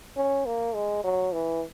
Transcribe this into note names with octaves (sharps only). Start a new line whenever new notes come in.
C#4
A#3
G#3
F#3
E3